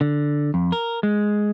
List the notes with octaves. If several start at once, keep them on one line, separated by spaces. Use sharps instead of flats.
D3
F2
A#4
G#3